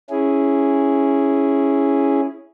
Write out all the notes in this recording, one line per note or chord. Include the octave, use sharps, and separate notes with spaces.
C#4 E4 G#4